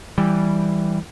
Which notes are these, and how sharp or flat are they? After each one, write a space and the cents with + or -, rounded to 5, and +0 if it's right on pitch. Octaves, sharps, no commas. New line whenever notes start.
E3 +0 G3 +0